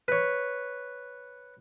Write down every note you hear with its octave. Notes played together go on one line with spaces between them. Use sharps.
B4 C#5